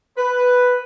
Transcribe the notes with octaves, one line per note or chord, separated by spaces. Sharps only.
B4